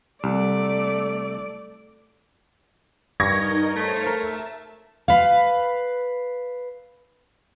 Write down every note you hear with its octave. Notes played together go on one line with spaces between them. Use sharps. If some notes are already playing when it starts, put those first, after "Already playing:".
C2 A3 D5
G2 D#4 A#4 D#5 C#6 G#6 A#6
A3 C5 C#5 F5
A#4 E5 A5
B4 F5